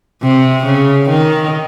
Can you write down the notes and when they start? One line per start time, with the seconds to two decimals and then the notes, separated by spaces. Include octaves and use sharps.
0.23 C3
0.66 C#3
1.09 D#3